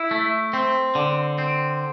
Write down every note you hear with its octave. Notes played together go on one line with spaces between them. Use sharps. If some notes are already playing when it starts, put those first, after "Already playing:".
Already playing: E4
A3
C4
D3
C4